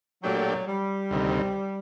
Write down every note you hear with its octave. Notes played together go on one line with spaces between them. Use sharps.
A#2 F#3 A3 D4 G4
G3
D2 C3 D#3